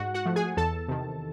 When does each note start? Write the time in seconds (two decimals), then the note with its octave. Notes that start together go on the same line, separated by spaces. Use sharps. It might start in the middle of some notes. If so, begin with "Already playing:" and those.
Already playing: G#2 F#4 F#5
0.14 F#4 F#5
0.25 F3 A3
0.36 G#4 G#5
0.57 E2 A4 A5
0.88 C3 D#3